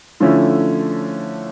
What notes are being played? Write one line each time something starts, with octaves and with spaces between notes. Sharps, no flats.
D3 F3 A3 C#4 E4